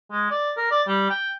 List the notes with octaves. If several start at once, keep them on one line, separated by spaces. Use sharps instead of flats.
G#3
D5
A#4
D5
G3
G5